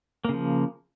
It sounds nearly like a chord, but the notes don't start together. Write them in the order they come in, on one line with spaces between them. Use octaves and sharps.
A#3 C#3 F3